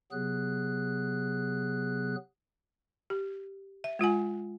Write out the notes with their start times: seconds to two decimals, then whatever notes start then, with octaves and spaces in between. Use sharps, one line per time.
0.12 C3 F#3 B3 G#4 F#6
3.10 G4
3.84 E5
3.99 G#3 F4 F#5 G#5